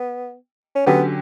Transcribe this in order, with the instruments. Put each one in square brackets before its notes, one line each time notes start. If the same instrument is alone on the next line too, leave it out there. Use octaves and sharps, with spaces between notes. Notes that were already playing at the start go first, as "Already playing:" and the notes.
Already playing: [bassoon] B3
C#4
[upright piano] D3 F#3 C#4 G4 [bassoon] B3